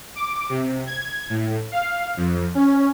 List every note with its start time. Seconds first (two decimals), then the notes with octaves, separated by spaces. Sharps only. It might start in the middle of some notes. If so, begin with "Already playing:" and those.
0.15 D6
0.49 C3
0.86 G#6
1.30 A2
1.72 F5
2.17 F2
2.55 C#4